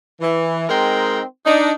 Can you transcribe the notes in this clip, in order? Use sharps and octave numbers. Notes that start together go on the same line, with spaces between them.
E3
G#3 C4 D#4 A#4 G5 C6
D4 D#4